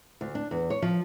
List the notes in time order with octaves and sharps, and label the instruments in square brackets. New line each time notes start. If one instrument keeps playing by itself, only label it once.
[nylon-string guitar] D2
D4
E2
C#5
F3